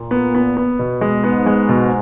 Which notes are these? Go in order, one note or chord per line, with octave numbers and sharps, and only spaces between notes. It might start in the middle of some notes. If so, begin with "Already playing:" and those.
Already playing: A#2
B3
B3
B3
B2
G#3
G#2 B3
G#3
B2